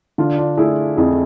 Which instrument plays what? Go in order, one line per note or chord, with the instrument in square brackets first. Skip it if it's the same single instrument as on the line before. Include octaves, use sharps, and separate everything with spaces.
[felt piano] D3 [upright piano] D4 F4
[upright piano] D4 F4
[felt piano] A3 [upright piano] E4 G#4
[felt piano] F2 [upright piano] E4 G#4